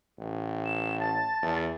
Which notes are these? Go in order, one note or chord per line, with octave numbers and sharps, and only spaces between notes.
A1
E7
A5 A6
E2